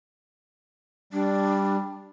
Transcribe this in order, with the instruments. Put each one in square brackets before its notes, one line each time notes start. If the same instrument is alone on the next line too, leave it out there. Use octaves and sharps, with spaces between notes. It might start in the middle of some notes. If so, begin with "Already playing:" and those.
[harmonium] G3 [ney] D4